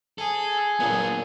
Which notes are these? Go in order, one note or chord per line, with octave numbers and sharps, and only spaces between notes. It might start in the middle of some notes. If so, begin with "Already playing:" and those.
G#4 A4
A#2 F#3 B3 D4